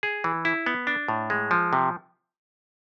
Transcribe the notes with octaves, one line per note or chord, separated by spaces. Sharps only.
G#4
E3
E4
B3
D4
A2
G#3
F3
C3